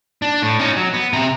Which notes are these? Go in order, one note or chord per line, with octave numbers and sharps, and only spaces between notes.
D4
A2
C#4 D#4
F#3
B3
C3 A#5